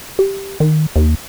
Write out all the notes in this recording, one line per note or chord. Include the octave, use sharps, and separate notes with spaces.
G4
D#3
D#2